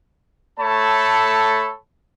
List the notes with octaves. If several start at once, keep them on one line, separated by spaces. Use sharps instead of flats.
A3 A4 C#5 A5 B5